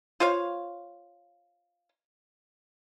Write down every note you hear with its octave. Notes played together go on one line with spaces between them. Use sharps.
F4 C5 C#5 F5